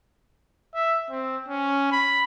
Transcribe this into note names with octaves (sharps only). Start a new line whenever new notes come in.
E5
C4
C#4
B5